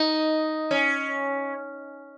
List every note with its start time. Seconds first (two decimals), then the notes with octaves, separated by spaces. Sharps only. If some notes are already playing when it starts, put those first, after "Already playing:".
Already playing: D#4
0.71 C#4